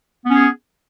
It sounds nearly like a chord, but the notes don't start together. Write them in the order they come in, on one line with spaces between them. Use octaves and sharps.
B3 C#4 G#4